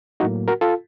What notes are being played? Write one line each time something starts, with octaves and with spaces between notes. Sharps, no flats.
A2 F#3 A#3 D#4 F#4
F#4 A#4
F4 A4